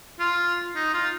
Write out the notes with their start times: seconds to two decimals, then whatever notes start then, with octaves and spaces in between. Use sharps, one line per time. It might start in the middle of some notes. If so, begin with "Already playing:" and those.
0.20 F4
0.76 D#4
0.94 F4